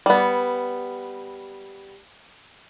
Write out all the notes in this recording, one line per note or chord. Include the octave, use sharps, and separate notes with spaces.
G3 B3